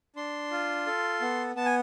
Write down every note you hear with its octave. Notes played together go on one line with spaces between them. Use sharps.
D4 C6
F4
A4
B3
B3 A5
G#5